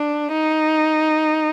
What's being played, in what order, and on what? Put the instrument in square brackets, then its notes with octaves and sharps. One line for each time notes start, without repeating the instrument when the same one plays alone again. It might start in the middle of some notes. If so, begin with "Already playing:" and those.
Already playing: [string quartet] D4
D#4